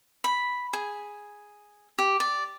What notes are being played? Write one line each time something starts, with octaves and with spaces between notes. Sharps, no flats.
B5
G#4
G4
D5